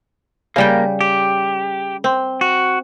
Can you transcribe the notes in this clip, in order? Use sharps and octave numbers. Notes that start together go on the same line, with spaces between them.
C#3 G3 A#3 G5
G4
C4
F#4